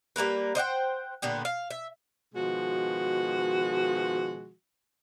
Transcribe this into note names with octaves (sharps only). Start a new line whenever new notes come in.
G3 A#3 A#4 B4
C5 D#5 F#5 G5
A#2 D3 B3 G4
F5
E5
B2 D#3 F3 G#3 F#4